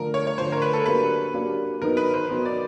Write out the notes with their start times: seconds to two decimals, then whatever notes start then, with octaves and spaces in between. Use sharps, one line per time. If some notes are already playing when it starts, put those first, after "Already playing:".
Already playing: D3 F3 A3 A#4
0.14 C#5
0.27 C#5
0.37 D3 F3 A3 C5
0.52 A#4
0.62 B4
0.73 A4
0.85 F#3 A#3 D4 G4 A#4 B4
1.33 F#3 A#3 D4 G4 A#4
1.82 D#3 F#3 B3 D#4 A#4
1.97 B4
2.14 C5
2.29 D#3 F#3 B3 D#4
2.45 D5